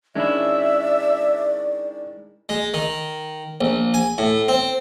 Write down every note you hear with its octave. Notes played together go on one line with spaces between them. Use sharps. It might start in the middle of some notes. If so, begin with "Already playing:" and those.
D#3 G#3 C#4 D4 E4 D5 E5
G#3
D#3
A#1
G#5
A2
C4